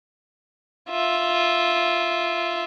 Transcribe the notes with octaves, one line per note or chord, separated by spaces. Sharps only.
F4 E5